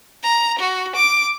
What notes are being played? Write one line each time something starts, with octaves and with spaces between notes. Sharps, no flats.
A#5
F#4
D6